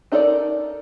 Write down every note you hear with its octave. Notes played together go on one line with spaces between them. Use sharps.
D4 D#4 A4 A#4 D5